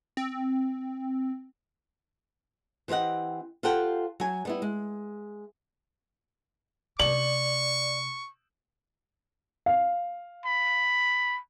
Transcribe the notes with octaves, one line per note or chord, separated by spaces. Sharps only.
C4
E3 C4 G4 D#5 F#5
F4 G4 A4 C5 F#5 G5
F#3 G#5
G3 B3 E4
G#3
C3 D5 C#6 F#7
F5
B5